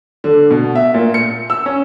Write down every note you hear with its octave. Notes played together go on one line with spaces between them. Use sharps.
D3
B2
E5
A#2
C#7
E6
C#4